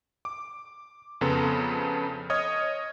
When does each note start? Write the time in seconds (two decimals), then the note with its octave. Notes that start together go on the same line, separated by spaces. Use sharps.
0.25 D6
1.21 F2 C#3 B3 A4 A#5 C6
2.30 C#5 D#5 D#6 F6 G#6